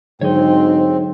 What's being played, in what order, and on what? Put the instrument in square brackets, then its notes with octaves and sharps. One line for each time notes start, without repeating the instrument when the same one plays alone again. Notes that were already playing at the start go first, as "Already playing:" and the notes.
[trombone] G#2 [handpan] D3 F#3 [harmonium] C4 [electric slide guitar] D#4 C#5